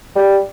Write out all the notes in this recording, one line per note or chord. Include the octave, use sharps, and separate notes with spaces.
G3